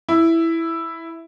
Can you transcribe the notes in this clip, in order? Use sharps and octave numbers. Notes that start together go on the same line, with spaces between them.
E4